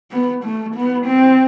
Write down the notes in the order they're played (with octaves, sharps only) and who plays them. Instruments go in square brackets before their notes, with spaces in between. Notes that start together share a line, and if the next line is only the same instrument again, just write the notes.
[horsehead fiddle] B3
A3
B3
C4